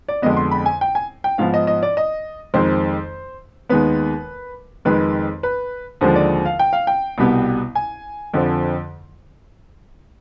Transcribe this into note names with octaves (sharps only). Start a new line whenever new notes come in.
D5
F2 D3 G#3 B3 D#5
C6
B5
G#5
G5
G#5
G5
G#2 F3 B3 F5
D#5
D#5
D5
D#5
F2 D#3 G#3 C4 C5
D#2 D#3 G#3 B3 B4
F2 D#3 G#3 B4
B4
D#2 D3 F3 G#3 C5
D5
F5
G5
F5
G5
C2 B2 G3 B3
G#5
F2 D3 F3 C4